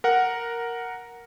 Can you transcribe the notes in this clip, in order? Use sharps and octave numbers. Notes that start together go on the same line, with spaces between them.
A#4 F#5